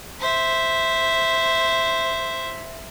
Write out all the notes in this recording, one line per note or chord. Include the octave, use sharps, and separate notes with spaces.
C5 E5